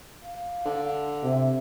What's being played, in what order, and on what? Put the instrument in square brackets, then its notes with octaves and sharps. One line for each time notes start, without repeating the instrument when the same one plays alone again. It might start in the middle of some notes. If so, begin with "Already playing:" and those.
[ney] F5
[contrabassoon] D3
[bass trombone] C3 [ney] E5